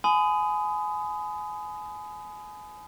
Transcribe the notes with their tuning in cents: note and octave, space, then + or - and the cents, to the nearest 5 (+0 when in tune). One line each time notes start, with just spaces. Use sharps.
G#5 +25 B5 +40 D#6 +0